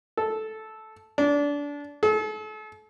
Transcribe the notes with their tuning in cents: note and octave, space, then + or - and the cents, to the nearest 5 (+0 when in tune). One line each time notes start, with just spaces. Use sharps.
A4 -10
D4 -25
A4 -40